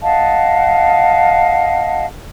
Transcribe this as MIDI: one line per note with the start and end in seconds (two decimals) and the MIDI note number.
0.01 2.05 75
0.01 2.05 77
0.01 2.05 78
0.01 2.05 81